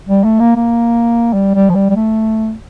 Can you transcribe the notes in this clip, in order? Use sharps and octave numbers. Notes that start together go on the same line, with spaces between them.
G3
A3
A#3
A#3
G3
G3
F3
G3
G3
A3